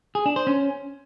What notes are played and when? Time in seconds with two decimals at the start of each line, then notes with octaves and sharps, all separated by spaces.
0.15 G#4
0.26 D4
0.36 C5
0.47 C#4